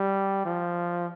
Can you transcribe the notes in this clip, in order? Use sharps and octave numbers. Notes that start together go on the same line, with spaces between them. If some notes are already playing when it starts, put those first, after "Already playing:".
Already playing: G3
F3